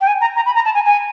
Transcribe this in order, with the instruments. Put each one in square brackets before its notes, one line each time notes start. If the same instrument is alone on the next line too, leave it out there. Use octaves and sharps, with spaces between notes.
[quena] G5
G#5
A#5
A#5
B5
A#5
A5
G#5
G#5